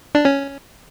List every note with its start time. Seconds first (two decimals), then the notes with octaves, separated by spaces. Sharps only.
0.15 D4
0.25 C#4